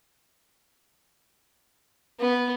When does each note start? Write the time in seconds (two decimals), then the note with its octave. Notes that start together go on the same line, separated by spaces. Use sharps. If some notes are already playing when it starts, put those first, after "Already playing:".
2.19 B3